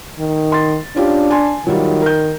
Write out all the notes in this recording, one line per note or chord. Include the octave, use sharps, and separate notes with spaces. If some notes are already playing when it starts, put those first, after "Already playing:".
D#3
C6 A6
C#4 D4 F4 G4
G#5 A5 C6
D#3 F#3 G3 F4
A#4 G6